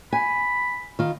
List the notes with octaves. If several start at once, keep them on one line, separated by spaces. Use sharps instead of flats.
G#5 B5
D#3 F4